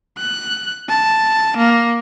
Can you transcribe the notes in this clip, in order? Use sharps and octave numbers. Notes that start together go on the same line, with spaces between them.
F#6
A5
A#3